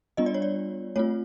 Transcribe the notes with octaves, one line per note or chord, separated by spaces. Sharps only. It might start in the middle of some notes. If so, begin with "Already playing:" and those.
G3 B3 D4 F4 D#5
D5
C#5
D5
A3 C4 F4 C#5